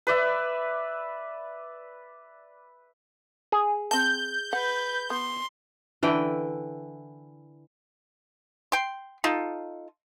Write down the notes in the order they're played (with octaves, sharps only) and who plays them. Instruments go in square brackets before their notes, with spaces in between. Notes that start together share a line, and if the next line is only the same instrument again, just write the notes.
[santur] B4 D5 E5
[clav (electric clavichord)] G#4
[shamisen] C4 A5 [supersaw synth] G6
[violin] B4 [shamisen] F#5
[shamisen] B3 [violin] C6
[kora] D3 E3 G5
[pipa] G5 C6
D#4 F4 A4